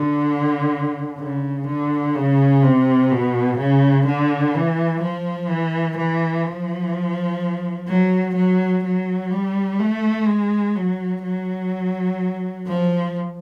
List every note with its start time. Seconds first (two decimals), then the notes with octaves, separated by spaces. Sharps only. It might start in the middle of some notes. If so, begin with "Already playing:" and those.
Already playing: D3
1.19 C#3
1.67 D3
2.15 C#3
2.63 C3
3.11 B2
3.58 C#3
4.06 D3
4.55 E3
5.01 F3
5.50 E3
5.97 E3
6.45 F3
7.88 F#3
8.36 F#3
8.84 F#3
9.31 G3
9.80 A3
10.27 G#3
10.76 F#3
11.23 F#3
12.67 F3